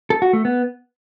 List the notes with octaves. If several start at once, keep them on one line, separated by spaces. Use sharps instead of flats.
A4
F#4
A3
B3